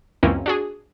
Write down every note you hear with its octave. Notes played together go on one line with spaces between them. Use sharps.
C#2 F#2 E3 A#3 C4 C#4
D4 F#4 G#4